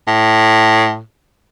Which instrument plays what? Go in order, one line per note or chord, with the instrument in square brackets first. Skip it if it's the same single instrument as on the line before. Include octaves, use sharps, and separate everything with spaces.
[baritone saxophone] A2